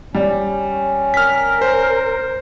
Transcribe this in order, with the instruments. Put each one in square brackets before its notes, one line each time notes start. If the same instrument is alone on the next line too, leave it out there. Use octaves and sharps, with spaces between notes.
[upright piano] G3 [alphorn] C#4
[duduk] A#4 [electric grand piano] F6 B6
[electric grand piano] C5